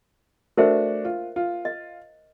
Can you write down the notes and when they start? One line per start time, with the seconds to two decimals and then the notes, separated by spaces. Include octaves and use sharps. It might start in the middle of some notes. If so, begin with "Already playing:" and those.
0.57 A3 D4 F#4 A#4 C5 E5
1.05 F4
1.36 F4
1.65 D#5